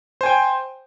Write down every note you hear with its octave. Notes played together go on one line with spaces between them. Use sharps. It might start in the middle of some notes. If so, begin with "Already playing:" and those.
C5 G5 G#5